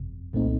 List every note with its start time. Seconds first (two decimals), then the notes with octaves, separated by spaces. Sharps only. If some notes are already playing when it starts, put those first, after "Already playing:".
Already playing: G1 F2 C3
0.33 C2 A#2 A3 C4 D#4